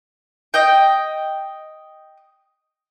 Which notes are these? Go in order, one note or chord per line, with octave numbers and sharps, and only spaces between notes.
D#5 G5